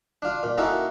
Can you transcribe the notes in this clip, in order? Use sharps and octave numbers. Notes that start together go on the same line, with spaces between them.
D4 F4
A#2
A#3 C#4 D#4 E4 F#4 A4